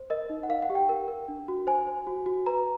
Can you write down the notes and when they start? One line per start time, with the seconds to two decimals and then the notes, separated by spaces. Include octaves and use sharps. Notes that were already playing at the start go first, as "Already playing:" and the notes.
Already playing: C5
0.10 A#4 D#5
0.30 D#4
0.43 F#5
0.49 A#4 F5
0.62 F#5
0.70 G4
0.75 G5
0.89 A#4
1.08 A#4
1.28 D4
1.48 F#4
1.67 C5 G#5
1.87 C5
2.07 F#4
2.26 F#4
2.46 B4 A#5